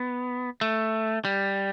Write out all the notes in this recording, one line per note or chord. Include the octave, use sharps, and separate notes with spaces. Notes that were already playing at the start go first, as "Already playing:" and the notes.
Already playing: B3
A3
G3